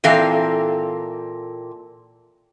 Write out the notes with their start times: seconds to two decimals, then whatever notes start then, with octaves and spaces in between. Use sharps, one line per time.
0.04 A#2 E3 C4 A4 F5